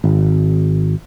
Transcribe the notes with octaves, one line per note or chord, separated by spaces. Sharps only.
G#1